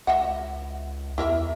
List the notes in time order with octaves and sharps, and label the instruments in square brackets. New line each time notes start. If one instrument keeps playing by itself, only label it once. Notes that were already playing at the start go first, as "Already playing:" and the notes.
[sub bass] C#2 [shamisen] D#5 E5 F#5
[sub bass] E2 [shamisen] E4 A#4 E5